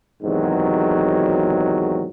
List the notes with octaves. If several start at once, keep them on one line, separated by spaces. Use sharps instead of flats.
E2 G#2 C3 D#3 F#3